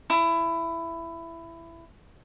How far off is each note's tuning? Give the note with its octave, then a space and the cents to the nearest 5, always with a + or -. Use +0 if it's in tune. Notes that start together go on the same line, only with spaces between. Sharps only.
E4 +15